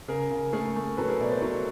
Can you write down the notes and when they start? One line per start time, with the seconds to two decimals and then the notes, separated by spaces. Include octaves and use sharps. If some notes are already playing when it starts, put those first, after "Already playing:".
0.08 C#3 G#4 A#4
0.31 C#3
0.53 A3 G#4 A#4
0.76 A3
0.97 F#3 A4 B4
1.08 G#4 A#4
1.20 B2 D5 E5
1.31 C5 D5
1.42 F#3 B4 C#5